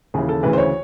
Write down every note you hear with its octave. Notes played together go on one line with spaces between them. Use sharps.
D#2 C#3 E3 G#4
A4
D2 C#3 E3 B4
C5
C#5